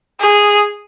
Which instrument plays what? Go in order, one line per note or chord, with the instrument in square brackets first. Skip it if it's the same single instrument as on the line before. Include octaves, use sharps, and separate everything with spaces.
[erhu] G#4